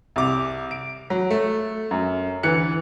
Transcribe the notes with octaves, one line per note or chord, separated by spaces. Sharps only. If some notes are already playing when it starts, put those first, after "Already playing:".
C2 D6 F7
D7
F#3
A3
F#2
D2 E3 F#6 C#7